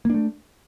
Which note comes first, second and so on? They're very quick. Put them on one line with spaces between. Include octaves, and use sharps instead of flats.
A#3 D4 A3